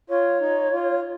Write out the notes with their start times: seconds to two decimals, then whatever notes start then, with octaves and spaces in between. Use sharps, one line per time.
0.09 F4 C#5
0.41 D#4
0.72 F4